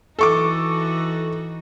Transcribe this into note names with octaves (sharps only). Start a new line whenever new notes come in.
E3 D#4 F#4 A4 C#6 D6